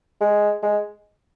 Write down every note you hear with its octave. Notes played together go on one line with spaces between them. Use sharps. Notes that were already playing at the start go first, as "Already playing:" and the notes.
G#3
G#3